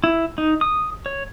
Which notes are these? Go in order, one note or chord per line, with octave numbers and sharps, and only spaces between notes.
E4
D#4
D#6
C#5